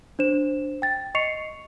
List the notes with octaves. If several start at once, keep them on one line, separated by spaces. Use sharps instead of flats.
D4 C5 E7
G5 A6
D#5 C#6 C7 C#7 F7